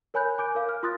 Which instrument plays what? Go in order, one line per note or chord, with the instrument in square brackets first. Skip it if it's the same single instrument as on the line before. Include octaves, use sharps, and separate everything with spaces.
[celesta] A#4 C#5 G#5 B5 F#6 G6
G#5 D6 G6 D7
A#4 F5
F6
F4 C6 D#6 F#6 A6